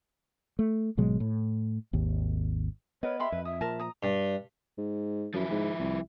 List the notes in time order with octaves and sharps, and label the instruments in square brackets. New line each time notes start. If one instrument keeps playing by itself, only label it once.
[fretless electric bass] A3
G#1 B2 F#3 G#3
A2
G#1 D#2
[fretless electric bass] B3 [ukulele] A#4 D#5 [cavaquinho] B4 [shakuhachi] C#5
[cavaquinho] G4 B5 C6 [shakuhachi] E5
[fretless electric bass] F2 [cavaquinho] B4
[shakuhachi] E5 [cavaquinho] D#6
[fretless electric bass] A#2 F3 [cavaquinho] A#4 A5
[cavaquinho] A#5 D#6
[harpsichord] G2
[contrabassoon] G#2
[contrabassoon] F#2 [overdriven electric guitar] F3 E4
[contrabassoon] G#2
C2